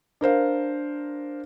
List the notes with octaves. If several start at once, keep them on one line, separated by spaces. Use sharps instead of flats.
D4 A#4 C5 F5